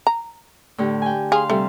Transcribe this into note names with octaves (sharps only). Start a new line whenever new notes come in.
A#5
A2 D3 G4
G5 G#5
G#4 F5 C6
C3 G3 A3